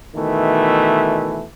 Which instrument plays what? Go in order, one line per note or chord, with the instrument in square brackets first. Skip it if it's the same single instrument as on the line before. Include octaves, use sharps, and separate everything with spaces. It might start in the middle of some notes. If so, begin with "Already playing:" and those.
[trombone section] B2 D#3 E3 A3